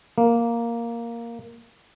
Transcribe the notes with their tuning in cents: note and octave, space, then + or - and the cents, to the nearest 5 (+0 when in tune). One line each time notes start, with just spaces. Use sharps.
A#3 +0